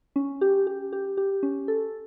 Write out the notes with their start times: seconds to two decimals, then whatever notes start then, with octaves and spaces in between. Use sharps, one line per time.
0.16 C#4
0.41 G4
0.67 G4
0.93 G4
1.17 G4
1.43 C#4
1.68 A4